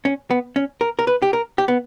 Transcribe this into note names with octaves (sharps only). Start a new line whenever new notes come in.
C#4
B3
C#4
A#4
A#4
B4
G4
A#4
G4
B3